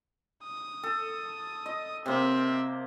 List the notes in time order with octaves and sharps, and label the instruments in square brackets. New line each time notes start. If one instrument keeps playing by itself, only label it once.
[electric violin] D#6
[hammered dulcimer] A4
D#5
[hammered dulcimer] C3 A#3 [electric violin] C4 E5